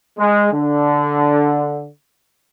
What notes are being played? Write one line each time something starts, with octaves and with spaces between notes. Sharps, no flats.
G#3
D3